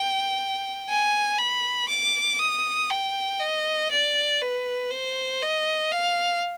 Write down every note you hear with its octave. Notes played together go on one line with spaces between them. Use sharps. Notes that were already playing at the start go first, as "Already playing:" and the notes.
Already playing: G5
G#5
B5
D6
D#6
G5
D#5
D5
B4
C5
D#5
F5